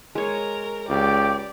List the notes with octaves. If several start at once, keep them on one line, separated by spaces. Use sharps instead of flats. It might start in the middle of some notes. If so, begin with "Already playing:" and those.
G#3 A#4 C#5 A#5
C#2 G4 D5